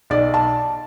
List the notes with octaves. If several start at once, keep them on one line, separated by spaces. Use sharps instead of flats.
B1 D5
A5